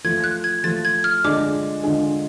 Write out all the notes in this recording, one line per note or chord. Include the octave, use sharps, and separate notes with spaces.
F3 A3 F4 G#6
F#6
G#6
F3 A3 F4 A6
G#6
F6
D3 G#3 D4 F4 G#4 D6
D3 G#3 D4 F4 G#4